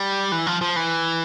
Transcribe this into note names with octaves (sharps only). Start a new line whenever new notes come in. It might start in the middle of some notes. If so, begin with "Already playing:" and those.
Already playing: G3
E3
F3
F3
E3